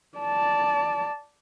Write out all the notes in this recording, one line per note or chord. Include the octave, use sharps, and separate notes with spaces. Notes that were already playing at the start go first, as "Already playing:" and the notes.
D5 A5